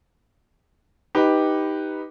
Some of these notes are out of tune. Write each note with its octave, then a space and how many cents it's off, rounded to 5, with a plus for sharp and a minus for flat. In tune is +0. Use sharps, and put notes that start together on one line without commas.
D#4 +10 G4 +0 B4 +0